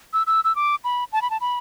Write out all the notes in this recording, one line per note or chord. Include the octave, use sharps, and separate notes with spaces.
E6
E6
E6
D6
B5
A5
B5
A5
B5